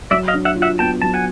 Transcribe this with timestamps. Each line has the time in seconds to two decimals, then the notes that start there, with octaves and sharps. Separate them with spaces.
0.11 F#3 D5 E5
0.28 D#5 F5
0.34 D4
0.45 E5 F#5
0.56 F4
0.62 E5 F#5
0.79 B3 G5 A5
1.02 F#3 A5
1.14 F#5 G#5